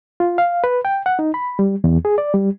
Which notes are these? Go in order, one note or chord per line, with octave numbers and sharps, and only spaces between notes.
F4
F5
B4
G5
F#5
D#4
B5
G3
E2
G#4
D5
G3